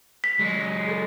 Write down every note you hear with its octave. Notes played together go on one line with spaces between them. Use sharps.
B6
F#3 G#3
G#4 A4